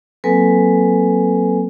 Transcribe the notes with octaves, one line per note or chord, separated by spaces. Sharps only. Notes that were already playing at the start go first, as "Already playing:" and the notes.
F#3 A#3 C4 A4 B4 G#5